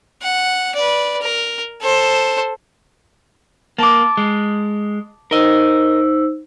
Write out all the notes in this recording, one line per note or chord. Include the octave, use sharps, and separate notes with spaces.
F#5
B4 D5
A#4
A4 C5
A#3 A5 D6
G#3
D#4 A#4 C5 D#5 E6